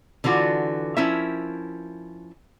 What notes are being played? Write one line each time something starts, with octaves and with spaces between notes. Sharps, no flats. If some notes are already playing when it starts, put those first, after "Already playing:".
D3 E3 F4 F#4
F3 C#4 E4 A#4 E5